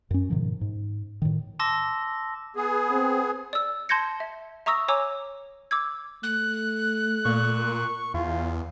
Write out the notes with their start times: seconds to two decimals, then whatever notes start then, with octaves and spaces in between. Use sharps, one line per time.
0.11 F#2 C#4
0.30 G#2 B2 D#3 F3
0.61 G#2
1.22 A2 D#3
1.59 A5 C6 D6 E6 A#6
2.56 B3 G#4
2.91 C4
3.53 D5 E6
3.89 A5 C6 G6 G#6 A#6 C#7
4.20 E5
4.66 E5 A#5 C#6 D#6 E6 A#6
4.88 C#5 G#5 A#5 D6 E6
5.71 D6 E6 G#6
6.23 A3 F#6
7.25 A#2 C#6
8.14 E2 F4